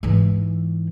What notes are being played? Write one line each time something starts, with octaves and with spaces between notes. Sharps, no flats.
G#2 E3